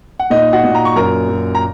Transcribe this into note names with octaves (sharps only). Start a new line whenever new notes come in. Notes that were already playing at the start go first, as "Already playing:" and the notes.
F#5
A#2 D#4 D#5
F#4 F#5
A#2
A#5
C#6
F#2 A#4 A#5
F#2
A#5